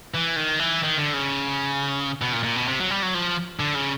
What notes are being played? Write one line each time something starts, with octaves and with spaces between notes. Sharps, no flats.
E3
D#3
E3
D#3
D3
C#3
B2
A#2
A#2
B2
C3
F#3
G3
F#3
F3
D3
C#3